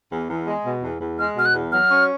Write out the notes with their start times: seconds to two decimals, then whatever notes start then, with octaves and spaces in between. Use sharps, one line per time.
0.12 E2
0.30 E2
0.47 G#3
0.65 B2
0.83 E2
1.01 E2
1.19 G#3 F6
1.36 B2 F6
1.45 F#6
1.55 E2
1.72 F#3 F6
1.91 C#4